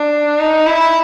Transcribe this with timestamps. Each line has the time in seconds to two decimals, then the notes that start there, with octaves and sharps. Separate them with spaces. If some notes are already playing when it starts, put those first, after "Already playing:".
Already playing: D4
0.39 D#4
0.67 E4